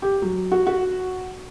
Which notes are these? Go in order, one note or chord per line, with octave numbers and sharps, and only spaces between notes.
G4
F#3
F#4
F#4